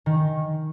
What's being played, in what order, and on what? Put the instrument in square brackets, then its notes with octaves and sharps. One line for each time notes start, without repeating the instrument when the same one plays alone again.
[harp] D#3